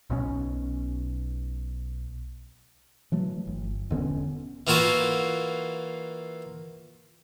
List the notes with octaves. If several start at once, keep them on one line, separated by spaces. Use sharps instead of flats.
B1 B2 E3 C#4
E3 F#3 A3
G1
E1 D3 B3 C#4
E3 A#3 F4 F#4 E5